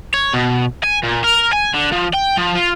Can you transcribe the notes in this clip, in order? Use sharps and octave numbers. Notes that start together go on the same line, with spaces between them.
C#5
B2
G#5
A#2
A#4
G#5
D3
F3
G5
F3
F4